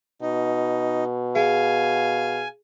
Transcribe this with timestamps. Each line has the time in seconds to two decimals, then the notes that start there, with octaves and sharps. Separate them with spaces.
0.22 B2 D#4
1.35 G#4 F5 G#5